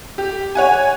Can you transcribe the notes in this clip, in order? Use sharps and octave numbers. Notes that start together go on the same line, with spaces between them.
G4
C#5 F#5 G#5